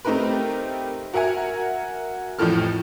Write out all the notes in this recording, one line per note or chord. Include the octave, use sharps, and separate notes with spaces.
A3 C4 D#4 G4 A#4 B4
F#4 A#4 E5 F#5 G#5
A1 F2 A2 F3 A4 F6